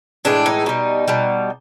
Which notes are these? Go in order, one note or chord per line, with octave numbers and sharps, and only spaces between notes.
A2 E3 G#3 D4
D#4
B2 G3
B2 G3